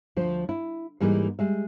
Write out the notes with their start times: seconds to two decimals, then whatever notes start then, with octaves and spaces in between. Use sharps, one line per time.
0.16 D2 F3 C5
0.49 E4
1.00 G#2 E3 G3 A#3 D#4 G#4
1.39 G3 G#3 E5